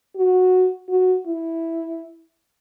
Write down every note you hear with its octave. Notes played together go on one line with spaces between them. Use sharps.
F#4
F#4
E4